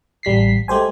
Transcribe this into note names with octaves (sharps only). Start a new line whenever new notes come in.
A1 G3 B6 C7
G#3 A3 G4 C5 G#5